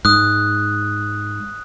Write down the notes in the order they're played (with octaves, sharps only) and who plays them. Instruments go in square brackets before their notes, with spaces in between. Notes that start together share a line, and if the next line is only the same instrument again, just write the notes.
[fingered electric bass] G#2 [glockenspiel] D#6 F#6